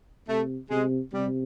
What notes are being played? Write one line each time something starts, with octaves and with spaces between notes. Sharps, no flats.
C3 A3
C3 G#3
C3 G3